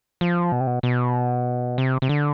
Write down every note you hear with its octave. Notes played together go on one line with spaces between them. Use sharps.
F3
B2
C3
B2
B2
C3
C3
D3